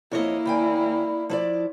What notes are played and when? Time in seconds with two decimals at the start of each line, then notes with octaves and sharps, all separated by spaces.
0.12 F2 A#3 E4 C#5 D#5
0.46 D#2 D5 G5 G#5 B5
1.29 F3 E4 D5